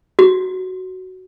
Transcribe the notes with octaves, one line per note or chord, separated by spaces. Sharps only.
F#4